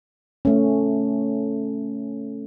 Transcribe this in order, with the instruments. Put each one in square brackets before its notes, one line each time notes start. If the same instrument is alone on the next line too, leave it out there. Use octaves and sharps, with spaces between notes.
[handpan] A3 C#4